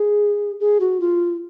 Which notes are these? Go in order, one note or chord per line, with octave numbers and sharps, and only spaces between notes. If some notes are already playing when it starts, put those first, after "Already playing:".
Already playing: G#4
G#4
F#4
F4